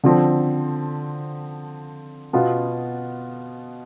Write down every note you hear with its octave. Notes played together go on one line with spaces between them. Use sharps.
D3 F3 C4
B2 B3 F4